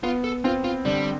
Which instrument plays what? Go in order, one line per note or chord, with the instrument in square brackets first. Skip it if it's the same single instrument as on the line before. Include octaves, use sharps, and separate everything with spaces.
[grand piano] B3 [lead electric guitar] F4
[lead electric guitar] A4
[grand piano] C4 [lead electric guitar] F4
[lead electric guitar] F4
[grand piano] D3 [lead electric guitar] G3